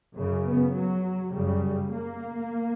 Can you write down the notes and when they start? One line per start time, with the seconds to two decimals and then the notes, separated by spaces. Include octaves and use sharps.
0.16 F#2 C#3
0.44 B3
0.73 F#3
1.32 F#2 C#3 G3
1.91 A#3